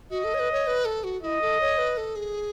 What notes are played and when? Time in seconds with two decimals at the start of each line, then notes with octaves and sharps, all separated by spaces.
0.11 F#4 D#5
0.24 A4
0.34 C#5
0.39 B4
0.52 C#5
0.67 B4
0.85 A4
1.04 F#4
1.22 E4 D#5
1.42 A4
1.61 C#5
1.78 B4
1.97 A4
2.16 G#4